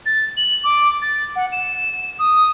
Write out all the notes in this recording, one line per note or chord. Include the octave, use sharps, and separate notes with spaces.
A6
F#7
D6
A6
F#5
E7
D#6